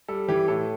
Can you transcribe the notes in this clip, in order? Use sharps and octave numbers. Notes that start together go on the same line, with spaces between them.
G3 A4
E3 G4
A2 A4